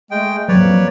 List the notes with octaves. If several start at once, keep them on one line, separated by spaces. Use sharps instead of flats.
G#3 A3 G5
F2 F#3 A#3 B4 C#5 D5